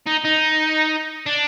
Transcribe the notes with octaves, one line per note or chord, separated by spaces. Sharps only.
D#4
D#4
D4